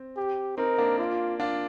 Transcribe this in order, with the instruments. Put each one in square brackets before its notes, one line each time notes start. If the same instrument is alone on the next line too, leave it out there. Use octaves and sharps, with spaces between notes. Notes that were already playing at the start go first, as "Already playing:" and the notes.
Already playing: [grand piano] C4
[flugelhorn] G4
[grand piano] C4 D#4 [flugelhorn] A#4
[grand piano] A#3 D4
[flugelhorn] F4
[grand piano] D4 F4